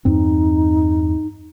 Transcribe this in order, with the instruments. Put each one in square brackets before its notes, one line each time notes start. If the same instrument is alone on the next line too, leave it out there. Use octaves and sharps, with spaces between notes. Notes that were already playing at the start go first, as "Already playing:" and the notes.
[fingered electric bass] E2 G2 C4 [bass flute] D#4